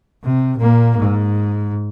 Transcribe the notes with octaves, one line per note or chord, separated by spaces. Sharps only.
C3
A#2 A#3
G#2